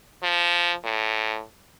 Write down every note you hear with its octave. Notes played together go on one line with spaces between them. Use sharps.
F3
A2